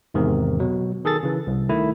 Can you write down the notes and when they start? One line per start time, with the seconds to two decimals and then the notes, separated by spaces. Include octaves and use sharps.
0.14 E2 G#2 C3 D#3
0.60 B2 F#3
1.05 D#3 G#4 A4 A6
1.23 C#3 E3
1.47 C2
1.69 D#3 A3 E4